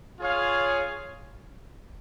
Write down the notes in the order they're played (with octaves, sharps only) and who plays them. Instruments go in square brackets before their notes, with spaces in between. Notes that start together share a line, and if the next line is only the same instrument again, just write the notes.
[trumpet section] F4 G#4 C#5 F5